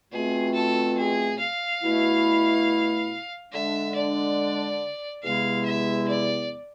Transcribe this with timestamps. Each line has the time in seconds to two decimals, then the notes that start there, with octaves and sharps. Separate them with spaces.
0.12 B2 A3 C4 F4 G#4
0.54 A4
0.98 G#4
1.39 F5
1.82 B2 A3 E4
3.52 D3 G#3 D4 E5
3.95 D5
5.22 E2 C3 G#3 B3 E4 F5
5.65 E5
6.08 D5